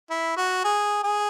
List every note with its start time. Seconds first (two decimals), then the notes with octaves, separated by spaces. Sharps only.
0.10 E4
0.37 F#4
0.64 G#4
1.04 G#4